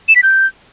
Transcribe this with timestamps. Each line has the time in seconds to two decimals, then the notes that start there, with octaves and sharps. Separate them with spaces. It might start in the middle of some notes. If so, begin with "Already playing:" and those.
0.09 E7
0.16 B6
0.23 G6